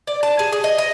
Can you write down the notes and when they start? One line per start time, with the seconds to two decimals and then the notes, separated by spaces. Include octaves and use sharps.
0.07 D5
0.23 A5
0.39 G#4
0.52 G#4
0.64 D#5
0.79 D#5